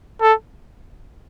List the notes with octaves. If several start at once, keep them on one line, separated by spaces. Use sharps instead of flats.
A4